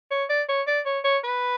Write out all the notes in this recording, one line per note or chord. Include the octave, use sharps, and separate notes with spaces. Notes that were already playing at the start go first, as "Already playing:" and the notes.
C#5
D5
C#5
D5
C#5
C#5
B4